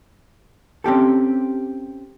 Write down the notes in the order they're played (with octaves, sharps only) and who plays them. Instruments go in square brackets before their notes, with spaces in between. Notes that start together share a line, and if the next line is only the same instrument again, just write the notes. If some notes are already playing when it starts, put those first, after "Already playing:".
[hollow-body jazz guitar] C4 C#4 G4 A4